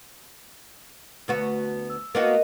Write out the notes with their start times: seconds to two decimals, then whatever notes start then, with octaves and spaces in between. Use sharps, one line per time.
1.28 D2 B3 F#4
1.90 E6
2.15 A#3 B3 F#4 A#4 D#5